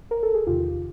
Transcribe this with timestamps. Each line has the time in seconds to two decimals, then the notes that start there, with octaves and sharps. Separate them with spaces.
0.11 A#4
0.23 A4
0.34 G#4
0.47 E2 C3 D#3 F4 G4